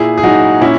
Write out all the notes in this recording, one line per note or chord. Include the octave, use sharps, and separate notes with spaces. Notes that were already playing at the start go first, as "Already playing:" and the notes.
Already playing: A#2 E4 G#4
G#4
F#3 D#4 F#4
A#2 C#4 E4